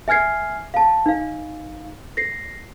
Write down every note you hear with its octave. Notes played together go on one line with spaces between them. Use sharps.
E5 G#5 F6 G#6 C7
F5 A5
D#4 F5
A#6 C7